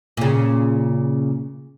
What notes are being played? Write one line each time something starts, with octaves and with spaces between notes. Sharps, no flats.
A#2 C#3